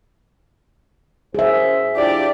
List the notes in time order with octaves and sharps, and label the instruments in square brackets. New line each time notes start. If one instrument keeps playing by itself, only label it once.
[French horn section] F#2 C5 [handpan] G#4 E5
[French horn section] F3 D4 E4 [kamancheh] G4 D5